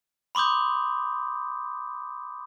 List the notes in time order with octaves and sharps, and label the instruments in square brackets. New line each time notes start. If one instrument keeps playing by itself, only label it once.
[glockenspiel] B5 C6 D6 D#6 G6